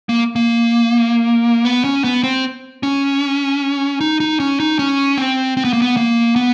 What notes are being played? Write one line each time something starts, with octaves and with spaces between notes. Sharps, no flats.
A#3
A#3
B3
C#4
B3
C4
C#4
D#4
D#4
C#4
D#4
C#4
C4
C4
B3
A#3
B3
A#3
B3